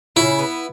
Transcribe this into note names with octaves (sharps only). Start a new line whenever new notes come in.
C#3 E4
B3